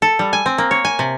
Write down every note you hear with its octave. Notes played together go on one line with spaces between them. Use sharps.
A4
G3
G#5
C4
A#3
C#5
G#5
C3